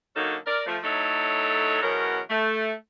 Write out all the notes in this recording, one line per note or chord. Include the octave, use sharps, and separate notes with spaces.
D3 F#3 A#3 C#4 D#4 A4
A#4 D5
F3 A3
F#3 A3 D#4 E4 A4 C#5
E2 B2 F#3 C#4 A#4
A3